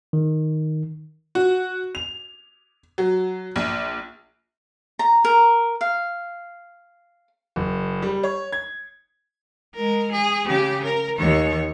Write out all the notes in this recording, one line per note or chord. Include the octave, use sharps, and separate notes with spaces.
D#3
F#4
F7
F#3
A#1
A#5
A#4
F5
F#1
G3
C#5
G#6
G#3 A#4
G#4
C#3 G4
A#4
D#2 C#5